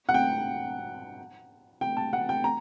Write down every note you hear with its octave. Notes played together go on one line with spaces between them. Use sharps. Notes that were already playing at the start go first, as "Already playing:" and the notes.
F#5
G5
G5
A5
F#5
G5
A#5